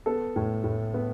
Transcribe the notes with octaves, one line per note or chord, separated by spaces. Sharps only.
B3 A4
A2
A2
B3